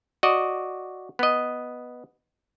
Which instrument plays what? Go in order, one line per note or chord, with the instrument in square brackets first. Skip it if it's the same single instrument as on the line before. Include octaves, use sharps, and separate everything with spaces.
[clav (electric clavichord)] F#4 D5 D#5
B3 D#5